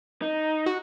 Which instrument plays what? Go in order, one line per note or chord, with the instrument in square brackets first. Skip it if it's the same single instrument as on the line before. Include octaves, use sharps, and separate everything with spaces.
[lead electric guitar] D#4
[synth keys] F#4